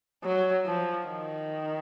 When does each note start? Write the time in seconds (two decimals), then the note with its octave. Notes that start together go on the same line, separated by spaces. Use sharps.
0.23 F#3
0.66 F3
1.08 D#3